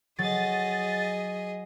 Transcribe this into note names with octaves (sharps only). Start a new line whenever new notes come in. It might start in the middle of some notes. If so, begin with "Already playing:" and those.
F#3 G#4 D#5 A6